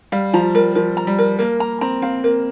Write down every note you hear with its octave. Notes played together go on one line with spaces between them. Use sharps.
G3 F5
F3 A#5
G3 A#4
F3 A#4
A#5
G3
A#4
A#3 A#4
A#3 A#5
C4 A#5
C4 F5
A#3 A#4